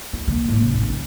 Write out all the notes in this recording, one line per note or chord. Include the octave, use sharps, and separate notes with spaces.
F4
D3 A#3
A2 A#3
C#3
G#1
C#2